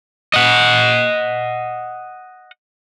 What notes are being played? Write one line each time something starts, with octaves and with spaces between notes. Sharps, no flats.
D#5 F#5